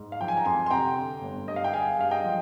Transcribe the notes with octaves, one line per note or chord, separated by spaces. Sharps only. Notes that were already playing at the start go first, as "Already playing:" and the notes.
Already playing: G#2
F5
F3 G5
G#5
A#5
F2 G#5 C6
C6
C3 G5 A#5
D3
G1
G2 D#5
F5
G5
G#3 F5 G#5
G2 F5
D#5 G5
F3